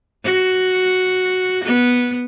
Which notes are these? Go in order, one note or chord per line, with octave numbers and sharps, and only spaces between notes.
F#4
B3